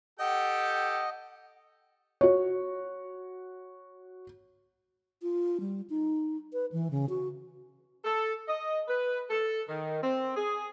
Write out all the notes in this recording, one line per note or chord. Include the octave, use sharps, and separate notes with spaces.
G4 A4 D#5 F#5 G5
F#4 C#5
F4
G3
D#4
B4
E3
C#3
F#4
A4
D#5
B4
A4
D#3
C4
G#4